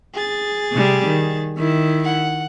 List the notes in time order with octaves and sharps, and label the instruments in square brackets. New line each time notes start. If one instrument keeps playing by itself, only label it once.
[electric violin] G#4 A6
[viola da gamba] C3 G3
D#3
D#3 E4
[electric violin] F#5